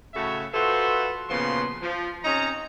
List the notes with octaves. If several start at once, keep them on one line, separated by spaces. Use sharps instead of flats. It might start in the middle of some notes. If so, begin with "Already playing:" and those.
A2 C#3 F#4 A4 C#5 E5
F4 F#4 A4 B4 C5 E5
A#2 C#3 F3 B3 F#4 C6
F3
C3 C#4 D#4 D#5 A#5